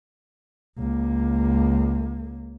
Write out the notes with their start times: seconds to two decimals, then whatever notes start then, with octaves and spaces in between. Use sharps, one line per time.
0.78 C#2 A#3